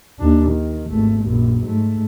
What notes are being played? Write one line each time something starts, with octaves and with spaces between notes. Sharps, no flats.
D#2 D4
D#3
G#1 A3
A#1 F#2
G#2 A3